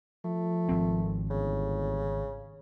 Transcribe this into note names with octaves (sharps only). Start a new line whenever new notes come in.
F3 A3
G#1 C4
G1 C#3